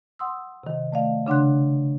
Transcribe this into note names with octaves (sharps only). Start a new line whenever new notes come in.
F#5 C6 D#6 E6
C3 D#3
A3 D5 F5
C#3 D4 F#5 C6 F#6